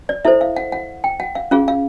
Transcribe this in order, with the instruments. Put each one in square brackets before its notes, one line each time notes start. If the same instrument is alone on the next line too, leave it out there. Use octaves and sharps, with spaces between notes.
[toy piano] D5
E4 A4 C5 E5
F5
F#5
F#5
G5
F#5
F5
C#4 F4 G#4 F5
F5